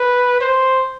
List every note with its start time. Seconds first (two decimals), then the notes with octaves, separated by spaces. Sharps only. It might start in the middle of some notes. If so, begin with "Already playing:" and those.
Already playing: B4
0.41 C5